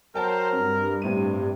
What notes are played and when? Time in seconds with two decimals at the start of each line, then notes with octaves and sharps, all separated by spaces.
0.15 F#3 A#4 C5 G5 A5
0.52 G2 C4
1.02 A2 C3 D#7